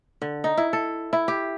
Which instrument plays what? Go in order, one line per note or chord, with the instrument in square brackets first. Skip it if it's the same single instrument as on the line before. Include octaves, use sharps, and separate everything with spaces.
[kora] D3
D#4
E4
A4
E4
G4